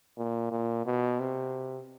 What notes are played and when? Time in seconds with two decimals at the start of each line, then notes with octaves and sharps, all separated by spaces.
0.18 A#2
0.51 A#2
0.86 B2
1.20 C3